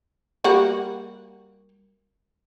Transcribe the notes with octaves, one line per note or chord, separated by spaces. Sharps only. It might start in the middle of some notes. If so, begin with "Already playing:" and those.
G3 A#3 F#4